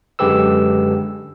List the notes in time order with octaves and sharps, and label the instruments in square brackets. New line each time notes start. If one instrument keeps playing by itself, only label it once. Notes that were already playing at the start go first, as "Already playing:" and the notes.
[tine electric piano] F#2 D3 G#3 G4 B4 E6